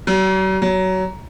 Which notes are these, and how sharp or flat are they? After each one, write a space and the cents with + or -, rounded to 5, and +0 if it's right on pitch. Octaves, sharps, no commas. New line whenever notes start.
F#3 +45
F#3 +20